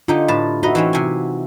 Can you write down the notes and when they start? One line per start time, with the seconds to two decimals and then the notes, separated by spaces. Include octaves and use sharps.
0.08 D3 D#4 F4 G4
0.28 A2 B4 A5
0.63 D#4 F#4 B4 D#5 E5
0.75 E3 C4 C#4 D#4
0.93 C3 G#5